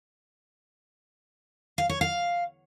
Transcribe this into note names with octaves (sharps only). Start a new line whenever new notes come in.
F5
C#5
F5